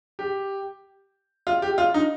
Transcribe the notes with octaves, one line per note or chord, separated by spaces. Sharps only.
G4
F4
G4
F4
D#4